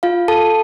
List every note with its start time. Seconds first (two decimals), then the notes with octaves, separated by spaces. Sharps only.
0.03 F4 F5
0.28 A4 A5